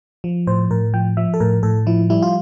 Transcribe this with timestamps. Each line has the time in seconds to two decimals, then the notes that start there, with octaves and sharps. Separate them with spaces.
0.24 F3
0.47 A2 C5
0.71 A2 A#4
0.94 F3 G5
1.17 F3 E5
1.34 A4
1.40 A2 A#4
1.63 A2 A4
1.87 F3 E4
2.10 G3 E4
2.22 F4